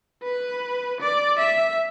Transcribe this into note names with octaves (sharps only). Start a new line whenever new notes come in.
B4
D5
E5